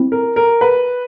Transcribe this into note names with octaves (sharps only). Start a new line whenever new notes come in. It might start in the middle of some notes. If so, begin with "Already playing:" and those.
Already playing: C4 E4
A#4
A#4
B4